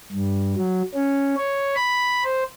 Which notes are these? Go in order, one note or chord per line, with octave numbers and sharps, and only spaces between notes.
G2
F#3
C#4
C#5
B5
C5